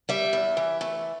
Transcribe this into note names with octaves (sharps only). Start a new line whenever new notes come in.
G3 E5
E2
E3
A3